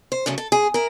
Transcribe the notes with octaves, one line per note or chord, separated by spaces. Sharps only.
C5
F#2 C#3 A3 C#4
A4
G#4
E4 A#4